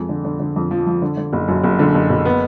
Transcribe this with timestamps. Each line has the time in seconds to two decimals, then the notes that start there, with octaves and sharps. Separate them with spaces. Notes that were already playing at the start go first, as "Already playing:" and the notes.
Already playing: F2 G#3
0.09 D3
0.25 D3
0.40 D3
0.56 F2
0.71 F3
0.87 F3
1.02 D3
1.17 D3
1.33 F#1
1.48 F#2
1.64 F#1
1.79 D3
1.95 F#1
2.10 F#1
2.25 B3